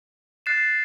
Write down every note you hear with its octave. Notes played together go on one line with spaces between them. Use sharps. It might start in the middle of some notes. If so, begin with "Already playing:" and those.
F#6 A6 C7 E7